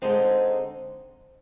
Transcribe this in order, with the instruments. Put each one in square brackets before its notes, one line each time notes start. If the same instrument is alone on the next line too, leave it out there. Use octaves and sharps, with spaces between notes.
[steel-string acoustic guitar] D3 G#3 C4 D#4